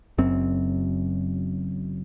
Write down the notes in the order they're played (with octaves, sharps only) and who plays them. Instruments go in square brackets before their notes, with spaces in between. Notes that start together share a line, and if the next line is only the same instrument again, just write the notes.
[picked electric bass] F#1 F#2 C4